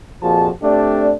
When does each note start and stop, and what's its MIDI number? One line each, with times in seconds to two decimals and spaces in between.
0.23 0.49 41
0.23 0.49 46
0.23 0.49 53
0.23 0.49 66
0.23 0.49 68
0.23 0.49 81
0.63 1.14 57
0.63 1.14 60
0.63 1.14 62
0.63 1.14 67
0.63 1.14 74